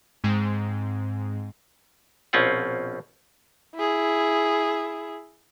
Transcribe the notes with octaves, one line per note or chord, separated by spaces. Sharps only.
G#2 G#3 C4
A#1 B2 C4 C#4 F4 F#5
E4 G#4